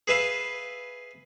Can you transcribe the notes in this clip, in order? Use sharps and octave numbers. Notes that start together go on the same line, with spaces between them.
G#4 B4 E5 F5